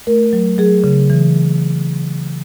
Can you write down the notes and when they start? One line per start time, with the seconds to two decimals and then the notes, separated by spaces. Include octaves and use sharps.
0.07 A3 A#4
0.33 F#3
0.58 F#3 G#4
0.84 C#3
1.10 E3